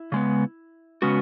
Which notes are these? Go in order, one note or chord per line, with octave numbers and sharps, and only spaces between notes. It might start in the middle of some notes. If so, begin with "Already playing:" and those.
Already playing: E4
C#3 G#3 B3
C#3 G#3 B3 C#4 F#4